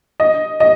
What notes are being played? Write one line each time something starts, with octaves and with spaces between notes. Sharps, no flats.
D#5
D#5